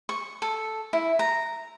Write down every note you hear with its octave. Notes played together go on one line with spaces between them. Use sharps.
C#6
A4
E4
A#5